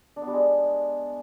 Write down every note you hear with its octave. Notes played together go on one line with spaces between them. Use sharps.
D4
B3
G3
G#3